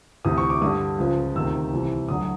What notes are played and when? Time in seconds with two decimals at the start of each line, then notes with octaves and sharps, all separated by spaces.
0.25 D2 C3 E3 D#6
0.38 C#6
0.50 D6
0.62 G2 D3 G3 D#6
0.98 C#2 C#3 F3
1.36 D2 C3 D#3 E6
1.72 C2 C3 E3
2.09 D2 D3 F#3 D#6